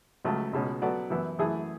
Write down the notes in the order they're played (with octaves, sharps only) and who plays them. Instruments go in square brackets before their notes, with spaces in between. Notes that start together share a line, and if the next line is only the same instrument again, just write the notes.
[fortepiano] C#2 C#3 F#3 A3
C#2 B2 G#3 C#4
F#3 B3 F#4 A4 D5
F#2 E3 B3 E4
F#2 E3 A3 E4 G#4